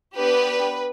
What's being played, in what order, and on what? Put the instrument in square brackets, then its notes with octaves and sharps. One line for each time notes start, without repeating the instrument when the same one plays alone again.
[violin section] B3 D4 G4 B4